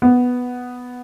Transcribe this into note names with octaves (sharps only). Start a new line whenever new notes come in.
B3